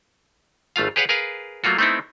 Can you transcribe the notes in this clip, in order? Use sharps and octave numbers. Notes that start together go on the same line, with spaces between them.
G#1 A3 F4 F5
G4 G#4 B4 C#5 F5 F#5
G#4 A#4 B4 F5
F#3 A3 A#3 F4 F#4
A3 B3 C4 D#4 E4